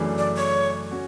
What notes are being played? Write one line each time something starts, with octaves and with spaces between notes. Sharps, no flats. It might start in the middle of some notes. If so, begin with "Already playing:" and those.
Already playing: F#2 C#3 E3 A3 D4
D5
C#5
C#4 F#4